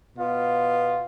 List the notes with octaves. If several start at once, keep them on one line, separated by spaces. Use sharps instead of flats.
B2 B3 F4